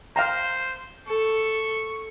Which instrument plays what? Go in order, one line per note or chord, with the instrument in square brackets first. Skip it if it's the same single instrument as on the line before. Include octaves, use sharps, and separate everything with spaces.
[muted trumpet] C5 [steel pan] F5 G5 A#5
[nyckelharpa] A4 [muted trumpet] C#6